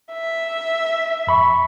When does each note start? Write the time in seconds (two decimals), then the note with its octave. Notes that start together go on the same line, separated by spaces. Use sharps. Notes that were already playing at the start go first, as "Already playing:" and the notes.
0.12 E5
1.27 F2 B5 C#6